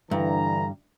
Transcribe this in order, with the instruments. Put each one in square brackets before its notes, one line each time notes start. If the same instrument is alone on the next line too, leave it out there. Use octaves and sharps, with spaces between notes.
[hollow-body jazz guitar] G2 [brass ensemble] D3 E3 A#5